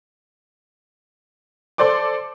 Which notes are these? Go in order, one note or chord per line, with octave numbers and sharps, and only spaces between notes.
A4 C5 D5 C6 D6